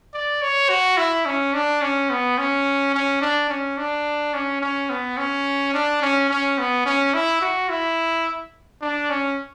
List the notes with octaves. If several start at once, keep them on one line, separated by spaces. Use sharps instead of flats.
D5
C#5
F#4
E4
C#4
D4
C#4
B3
C#4
C#4
D4
C#4
D4
C#4
C#4
B3
C#4
D4
C#4
C#4
B3
C#4
E4
F#4
E4
D4
C#4